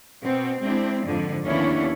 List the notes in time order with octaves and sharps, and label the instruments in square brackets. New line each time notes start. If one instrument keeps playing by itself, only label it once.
[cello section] B2 C4
G#3 C4 D4 E4
F2 G#2 D3 F3
D#2 B3 C#4 D4 E4 C#5